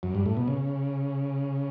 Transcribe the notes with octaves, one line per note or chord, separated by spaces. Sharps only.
F#2
G2
A2
B2
C#3